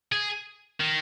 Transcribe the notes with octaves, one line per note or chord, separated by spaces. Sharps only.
G#4
D#3